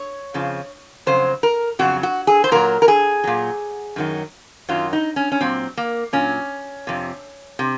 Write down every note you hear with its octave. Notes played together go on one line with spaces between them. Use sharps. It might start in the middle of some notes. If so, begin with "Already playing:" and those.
Already playing: C#5
F2 C#3 F3
F2 C#3 F#3 C5
A#4
F2 C#3 F#3 F#4
F#4
G#4
C5
A#2 F#3 A#4
A#4
G#4
A#2 F#3
F#2 D#3 F#3
F#2 D#3 F#3 F4
D#4
C#4
C#4
A#2 F#3 C4
A#3
A#2 F#3 C#4
F2 C3
C3